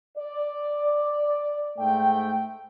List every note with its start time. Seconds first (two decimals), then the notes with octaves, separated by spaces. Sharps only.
0.17 D5
1.78 G#2 A3 G5